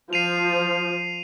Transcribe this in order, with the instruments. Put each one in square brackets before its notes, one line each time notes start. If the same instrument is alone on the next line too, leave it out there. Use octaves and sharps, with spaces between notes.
[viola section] F3 [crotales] C7 D#7 F7